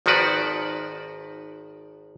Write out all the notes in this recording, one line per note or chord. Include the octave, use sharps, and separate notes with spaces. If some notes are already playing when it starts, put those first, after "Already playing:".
G#1 D#3 F3 F#4 B4 D5